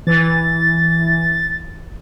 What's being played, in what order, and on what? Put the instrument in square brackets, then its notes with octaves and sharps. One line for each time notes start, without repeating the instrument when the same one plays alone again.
[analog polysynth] E3 [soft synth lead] A6